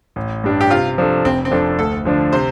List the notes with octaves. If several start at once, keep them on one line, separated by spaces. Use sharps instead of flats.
A1
G2 G3 D4
G4
C3 F4
F3 D4 A4
F1 C4
C4
F2 F3 D4 A4
D2 A4
D3 F3 D4
C3 C5